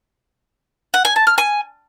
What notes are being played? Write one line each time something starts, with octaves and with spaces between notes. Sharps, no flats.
F#5
G#5
A5
F6
G#5